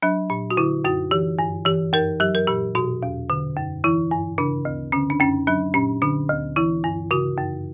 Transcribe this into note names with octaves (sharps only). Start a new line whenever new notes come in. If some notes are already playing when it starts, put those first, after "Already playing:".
F#3 D4
A#2
F#4
D3 E4
F#2 F#4
E3 G4
G2
E3 G4
F#2 A#4
F#3 G4
A#4
A#2 G4
B2 F#4
E2
D3
F#2
E3 E4
G2
C#3 D4
D2
D3 C#4
D4
F#2 C#4
F#3 D4
A#2 C#4
D3 D4
D2
E3 E4
G2
C#3 F#4
F#2